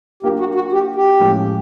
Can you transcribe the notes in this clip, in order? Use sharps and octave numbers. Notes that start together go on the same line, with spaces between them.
F#3 A#3 D4 F4 G4 A#4
F#4
F#4
G4
G4
A2 F3 G#3 C#4